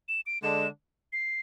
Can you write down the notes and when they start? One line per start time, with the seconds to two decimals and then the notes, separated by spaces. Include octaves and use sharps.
0.09 E7
0.26 D7
0.43 D3 G#3 D4 E7
1.13 C7